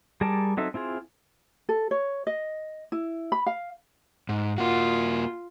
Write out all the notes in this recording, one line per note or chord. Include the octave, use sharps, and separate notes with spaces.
G3 G#4 A#4 D5 A5
F#3 C4 D#4 A4 E5
C4 E4 F4 G#4
A4
C#5
D#5
E4
B5
F5
G#2
A#3 F4 F#4